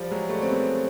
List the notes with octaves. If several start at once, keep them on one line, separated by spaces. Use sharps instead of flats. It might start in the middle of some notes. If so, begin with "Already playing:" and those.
Already playing: F3 G3
F#3 G#3
G3 A3
C4
A3 B3